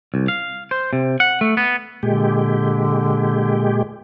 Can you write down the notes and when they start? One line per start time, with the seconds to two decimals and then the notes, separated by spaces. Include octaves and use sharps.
0.14 C2
0.28 F5
0.71 C5
0.93 C3
1.20 F#5
1.41 A3
1.57 B3
2.03 A#2 D3 G#3 G4